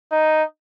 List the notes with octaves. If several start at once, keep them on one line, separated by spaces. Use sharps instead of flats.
D#4